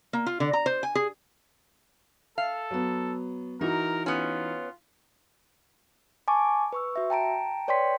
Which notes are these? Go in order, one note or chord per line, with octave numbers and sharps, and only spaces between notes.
A#3
F4
D3
A#5
C5
G#5
G#4
A4 F5
F#3 B3
E3 D#4 F#4 A#4
B3 C#4 F4
G#5 A5 C#6 D6
B4 C#6 E6
F#4 E5
G5 A5 A#5 D7
B4 C#5 D5 G5 C6 B6